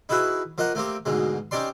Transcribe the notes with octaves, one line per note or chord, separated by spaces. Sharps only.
D#4 E4 F#4 G#4 B4 E5
F3 A#3 D#5 F#5 A#5
A3 A#3 C4 G4
D2 G#2 B2 G#3
C4 C#4 D#4 G4 D5 C6